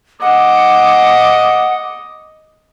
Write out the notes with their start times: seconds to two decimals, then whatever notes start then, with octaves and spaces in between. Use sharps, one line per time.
0.22 D#5 F#5 D6